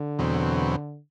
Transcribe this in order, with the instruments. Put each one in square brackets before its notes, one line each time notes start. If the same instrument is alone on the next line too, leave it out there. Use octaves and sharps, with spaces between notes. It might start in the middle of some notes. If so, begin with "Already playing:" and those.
Already playing: [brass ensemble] D3
[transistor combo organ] E2 B2 F#3 C4